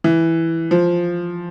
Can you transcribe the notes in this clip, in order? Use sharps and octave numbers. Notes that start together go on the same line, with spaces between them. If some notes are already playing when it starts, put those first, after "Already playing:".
E3
F3